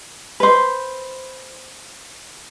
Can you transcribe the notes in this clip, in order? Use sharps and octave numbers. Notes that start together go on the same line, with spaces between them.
B4 C5